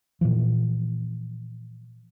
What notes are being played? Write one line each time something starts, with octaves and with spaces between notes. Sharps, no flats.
A#2 C#3 E3 F3